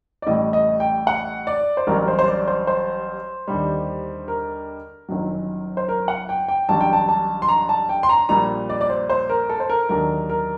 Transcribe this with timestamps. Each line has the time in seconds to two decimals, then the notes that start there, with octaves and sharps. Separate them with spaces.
0.22 D5
0.27 A1 A2 G3 D#5
0.53 D#5
0.80 G5
1.07 F#5
1.47 D5
1.77 C5
1.87 A1 G2 F#3 A#4
2.08 C5
2.19 C5
2.27 D5
2.48 C5
2.67 C5
3.48 D#2 D3 G3
4.28 A#4
5.09 G1 F#2 D#3 F#3
5.77 C5
5.89 A#4
6.08 F#5
6.29 G5
6.48 G5
6.69 A1 G2 D3 F#3 A5
6.81 G5
6.93 A5
7.09 A5
7.42 C6
7.48 A#5
7.69 A5
7.89 G5
8.03 C6
8.09 A#5
8.29 A#1 A#2 G3 A#5
8.70 D5
8.81 D5
8.90 C5
9.10 C5
9.30 A#4
9.49 A4
9.60 C5
9.70 A#4
9.89 D#2 D3 F#3 A#4
10.29 A#4